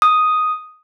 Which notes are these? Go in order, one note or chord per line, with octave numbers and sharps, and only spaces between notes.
D#6